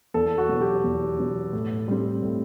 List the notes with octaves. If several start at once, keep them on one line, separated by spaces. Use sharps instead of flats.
E2 A4
F#4
B2 F#3 B3
G4
E2
B2 F#3 B3
A2
G3 C4
A2